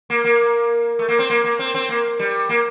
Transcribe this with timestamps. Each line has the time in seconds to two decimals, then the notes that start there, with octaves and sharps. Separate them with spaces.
0.10 A#3
0.24 A#3
0.99 A3
1.08 A#3
1.19 C4
1.30 A#3
1.44 A#3
1.59 C4
1.74 C4
1.89 A#3
2.19 G3
2.49 A#3